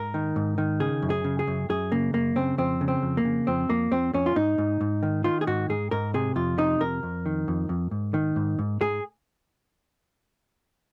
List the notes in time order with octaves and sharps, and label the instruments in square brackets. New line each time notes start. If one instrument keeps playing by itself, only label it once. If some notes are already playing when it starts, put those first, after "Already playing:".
Already playing: [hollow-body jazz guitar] G#2 A#4
D#3
G#2
D#3
C#3 G#4
F#2
G#4
C#3
G#4
F#2
F#2 G#4
C#3 A#3
F#2 A#3
C#3 C4
F2 C4
C#3
C4
F2
A#3
C#3
F2 C4
F2 A#3
F2 C4
F2 C#4
F4
G#2 D#4
G#2
G#2
D#3
D#3 F4
G#4
G#2 F#4
G#2 G#4
G#2 A#4
C3 G#4
F2 F4
C3 D#4
F2 A#4
F2
D#3
F2
F2
G#2
D#3
G#2
G#2
G#2 G#4